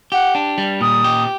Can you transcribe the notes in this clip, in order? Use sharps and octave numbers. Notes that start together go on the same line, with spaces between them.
G4 F#5
D4
G3
A#2 D#6
G4